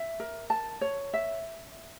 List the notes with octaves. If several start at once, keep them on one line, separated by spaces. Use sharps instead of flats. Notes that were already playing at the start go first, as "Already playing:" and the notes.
Already playing: E5
A#4
A5
C#5
E5